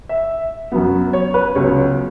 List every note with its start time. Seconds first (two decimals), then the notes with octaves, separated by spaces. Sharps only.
0.09 E5
0.72 F#2 F#3 B3
1.13 C#5
1.34 B4
1.55 C#2 C#3 F#3 B3 C#5